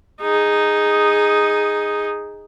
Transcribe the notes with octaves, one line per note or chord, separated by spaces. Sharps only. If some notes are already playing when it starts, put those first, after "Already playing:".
D#4 G#4